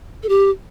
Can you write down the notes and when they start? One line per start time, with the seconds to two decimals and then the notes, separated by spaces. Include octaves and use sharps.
0.23 A4
0.29 G4